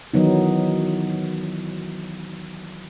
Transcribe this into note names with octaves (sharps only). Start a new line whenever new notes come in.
D#3 E3 F#3 B3 D#4